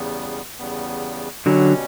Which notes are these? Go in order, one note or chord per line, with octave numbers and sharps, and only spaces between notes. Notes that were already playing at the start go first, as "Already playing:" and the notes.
Already playing: E2 C#3 G3 B3
E2 C#3 G3 B3
B2 D3 F#3 G3 C#4